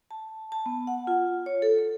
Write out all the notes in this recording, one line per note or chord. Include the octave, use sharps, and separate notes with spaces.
A5
A5
B3
F#5
F4
C#5
A4
A4